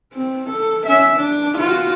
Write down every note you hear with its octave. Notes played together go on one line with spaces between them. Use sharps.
C4
A4
C#4 E5
D4
F4 F#4